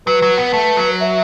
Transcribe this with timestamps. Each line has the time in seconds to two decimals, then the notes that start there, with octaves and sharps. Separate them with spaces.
0.07 F#3 B4
0.22 F#3
0.38 B3
0.53 A3
0.77 F#3
1.00 E5